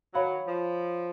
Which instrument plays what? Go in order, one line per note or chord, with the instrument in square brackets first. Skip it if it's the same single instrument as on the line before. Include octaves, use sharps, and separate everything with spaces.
[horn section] D#3 F#3 [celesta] C#5 F5 B5
[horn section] F3